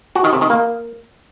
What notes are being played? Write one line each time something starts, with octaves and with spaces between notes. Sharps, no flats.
F#4
D#3
C3
D#3
A#3